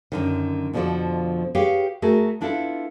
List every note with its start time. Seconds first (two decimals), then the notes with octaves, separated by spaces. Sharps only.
0.12 F#2 D3 D#3
0.73 F2 B2 D3 F3 A4 D5
1.55 G4 G#4 B4 C#5 F5 G5
2.02 A3 F#4 G#4 A#4
2.41 B3 D4 E4 F4 G#4 A4